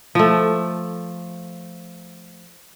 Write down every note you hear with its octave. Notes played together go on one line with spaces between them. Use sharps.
F3 A3